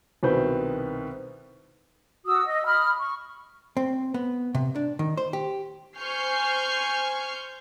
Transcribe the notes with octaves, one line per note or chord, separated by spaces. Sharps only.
C2 B2 D#3 C4 B4 G6
F#4 D#6 E6
D#5
B5 D#6 F6
C#6
C4
B3
C3
D4
D#3
C5
G4
C5 G#5 C#6 F6 G6 C7